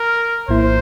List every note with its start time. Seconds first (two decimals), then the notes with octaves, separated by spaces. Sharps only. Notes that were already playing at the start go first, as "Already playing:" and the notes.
Already playing: A#4
0.48 A#1 A2 F3 A#3 E4 C5